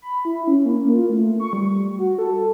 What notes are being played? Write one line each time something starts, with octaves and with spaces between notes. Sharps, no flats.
B5
E4
C#4
A#3
F4
A3
C#6
G3
F#4
A4